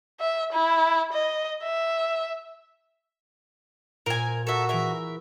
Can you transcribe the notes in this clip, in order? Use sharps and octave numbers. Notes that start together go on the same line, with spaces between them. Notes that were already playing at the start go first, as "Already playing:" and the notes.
E5
E4
D#5
E5
A#2 A#4 C5 G#5 D7
F#4 A4 A#4 E5
E3 G#4 A#4 E5